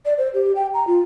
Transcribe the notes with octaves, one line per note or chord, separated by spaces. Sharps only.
D5
C5
G4
G5
A#5
F4